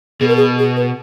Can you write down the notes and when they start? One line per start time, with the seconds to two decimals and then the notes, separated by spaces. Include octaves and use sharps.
0.21 B2 G#4
0.28 A#4
0.37 G#4
0.59 G#4
0.77 B4